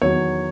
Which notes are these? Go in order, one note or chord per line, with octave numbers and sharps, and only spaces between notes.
E2 D#3 F#3 C#5